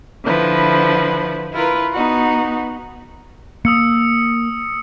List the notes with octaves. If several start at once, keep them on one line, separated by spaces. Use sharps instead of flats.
D3 F3 E4 B4
E4 F4 A#4 B4
B3 D#4 F#4
A#3 D#6 E6 C#7